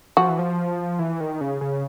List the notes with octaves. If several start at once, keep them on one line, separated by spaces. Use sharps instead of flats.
F3 F#4
E3
F3
E3
D#3
C#3
C#3